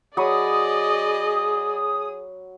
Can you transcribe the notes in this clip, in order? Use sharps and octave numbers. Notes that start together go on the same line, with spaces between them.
F#3 G#4 D5 D#5 B5 C#6 D#6